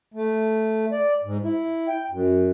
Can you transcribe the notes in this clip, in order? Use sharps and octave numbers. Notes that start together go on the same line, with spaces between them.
A3
D5
G#2
E4
G5
F#2